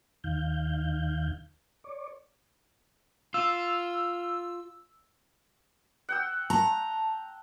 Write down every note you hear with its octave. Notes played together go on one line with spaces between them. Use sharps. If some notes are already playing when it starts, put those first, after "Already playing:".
D#2 D#3 F5 G6
C#5 D5
F4 E6
F#5 G5 E6
A5 A#5